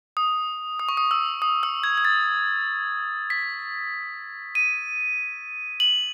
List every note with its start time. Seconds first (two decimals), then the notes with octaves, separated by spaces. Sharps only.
0.17 D#6
0.79 D#6
0.89 C#6
0.97 D#6
1.11 E6
1.42 D#6
1.63 E6
1.84 G#6
1.98 G#6
2.05 A6
3.30 B6
4.55 D#7
5.80 F#7